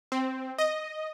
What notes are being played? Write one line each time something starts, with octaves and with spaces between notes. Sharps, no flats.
C4
D#5